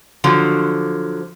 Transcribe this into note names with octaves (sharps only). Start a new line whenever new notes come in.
D3 F3 F#3